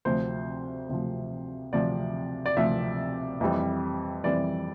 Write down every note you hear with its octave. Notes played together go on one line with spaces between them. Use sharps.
D2 C3 F3 C5
D2 C3 F3
D2 C3 F3 D5
D5
D2 C3 F3 E5
F2 E3 G3 C4
F2 E3 G3 C4 D5